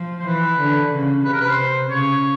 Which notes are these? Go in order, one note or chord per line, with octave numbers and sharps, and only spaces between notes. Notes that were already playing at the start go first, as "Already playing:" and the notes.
Already playing: F3
C5
E3 B4
D3
C#3
C3 B4
A#4
B4
C5
C#3 C#5